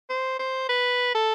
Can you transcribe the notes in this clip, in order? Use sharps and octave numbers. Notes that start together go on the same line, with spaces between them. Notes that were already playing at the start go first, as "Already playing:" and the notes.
C5
C5
B4
A4